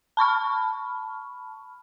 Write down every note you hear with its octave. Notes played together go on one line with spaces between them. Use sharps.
A5 B5 C#6 F6